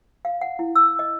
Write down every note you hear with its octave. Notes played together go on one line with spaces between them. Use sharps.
F5
F#5
E4
E6
D#5